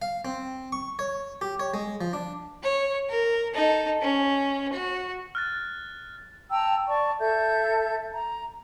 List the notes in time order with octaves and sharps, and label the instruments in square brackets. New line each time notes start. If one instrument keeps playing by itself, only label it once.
[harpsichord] F5
C4
C#6
C#5
G4
C#5
G#3
F3
D4
[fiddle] C#5
A#4
D#4 A4
C#4
F#4
[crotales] F6 F#6 A6
[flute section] G5 A5 A#5 E6
D5 A5 C#6
A4 E5 G6
A#5